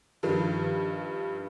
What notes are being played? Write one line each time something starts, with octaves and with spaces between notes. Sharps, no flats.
G2 D#3 F3 G3